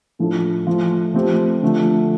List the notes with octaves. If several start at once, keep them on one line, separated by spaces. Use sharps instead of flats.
A2 F3 D4 A4
F3 A3 F4
F3 A3 C4 G4
D3 F3 A3